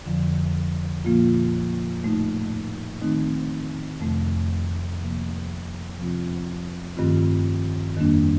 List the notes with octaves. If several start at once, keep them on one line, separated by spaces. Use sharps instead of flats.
F2 D3 F3
A#2 F3 A#3 F4
A2 A3 D#4
D#3 A3 C4 D#4
F2 C3 F3 A3
C3 F3 A#3
C3 F3 C4 F4
G2 D#3 A3 C4 F4
F2 D#3 G3 A#3 D4